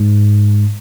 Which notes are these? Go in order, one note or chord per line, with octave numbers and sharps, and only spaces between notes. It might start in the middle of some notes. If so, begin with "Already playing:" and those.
Already playing: G#2